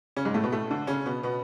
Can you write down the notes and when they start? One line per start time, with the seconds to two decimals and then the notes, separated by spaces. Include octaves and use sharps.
0.17 C#3 C#4
0.25 G#2 G#3
0.34 A2 A3
0.43 B2 B3
0.52 A2 A3
0.70 D3 D4
0.87 C#3 C#4
1.06 B2 B3
1.23 B2 B3